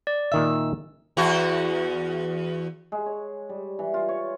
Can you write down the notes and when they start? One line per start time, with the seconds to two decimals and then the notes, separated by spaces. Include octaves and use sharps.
0.07 D5
0.32 A#2 D#3 E5 E6
1.17 E2 F#4
2.92 G#3
3.06 C#5
3.49 G3
3.79 E3
3.94 F4
4.09 C#5